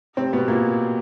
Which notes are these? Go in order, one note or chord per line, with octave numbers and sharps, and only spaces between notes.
C3 C4
B2 B3
A#2 A#3